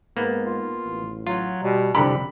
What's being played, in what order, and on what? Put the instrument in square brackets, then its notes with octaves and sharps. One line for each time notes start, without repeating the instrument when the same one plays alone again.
[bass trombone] G#2 [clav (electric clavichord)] A#3 B3
[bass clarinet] F4
[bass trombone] A1
[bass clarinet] F#3 [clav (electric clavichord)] F4
[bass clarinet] B2 [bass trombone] G3
[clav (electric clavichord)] C2 D3 G4 [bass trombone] F2 [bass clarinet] G3 [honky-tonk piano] B5